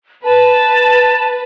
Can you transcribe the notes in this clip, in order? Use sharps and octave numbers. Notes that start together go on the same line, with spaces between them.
B4 A5